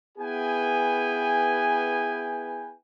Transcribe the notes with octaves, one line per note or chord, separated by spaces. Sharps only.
B3 E4 G#4 B4 G5 G#5